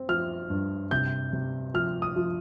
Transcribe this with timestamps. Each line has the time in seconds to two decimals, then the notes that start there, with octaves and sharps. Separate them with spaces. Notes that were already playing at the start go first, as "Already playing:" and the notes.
Already playing: C4
0.08 F3 F6
0.50 G2
0.91 C3 G6
1.33 C3
1.74 F3 F6
2.02 D#6
2.16 F3